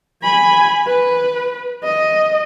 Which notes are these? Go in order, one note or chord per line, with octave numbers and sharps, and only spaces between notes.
G#5 B5
B4
D#5